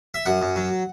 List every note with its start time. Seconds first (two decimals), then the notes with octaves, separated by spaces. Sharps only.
0.14 E5
0.26 F#2 F#5
0.42 F#2
0.56 F#3